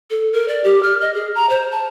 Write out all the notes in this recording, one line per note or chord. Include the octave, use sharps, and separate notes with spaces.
A4
A#4
D5
G4
F6
D#5
G#4
A#5
C5
A5